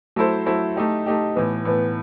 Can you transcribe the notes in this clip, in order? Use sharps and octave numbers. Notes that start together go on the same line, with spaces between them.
F#3 A3 E4 A4 C5
F#3 A3 E4 A4 C5
A3 D#4 G4
A3 D#4 G4
A2 E3 B3
A2 E3 B3